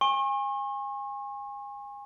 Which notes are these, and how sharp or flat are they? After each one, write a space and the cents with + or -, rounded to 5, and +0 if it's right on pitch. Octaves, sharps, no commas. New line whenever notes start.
G#5 -30 C#6 -40